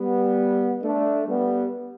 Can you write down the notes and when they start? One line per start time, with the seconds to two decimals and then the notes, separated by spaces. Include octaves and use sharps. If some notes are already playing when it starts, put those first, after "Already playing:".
Already playing: G3 B3
0.81 A3 D4
1.26 G3 B3